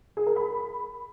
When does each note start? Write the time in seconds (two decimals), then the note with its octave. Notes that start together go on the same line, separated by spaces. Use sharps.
0.17 G#4
0.27 A#4
0.36 B5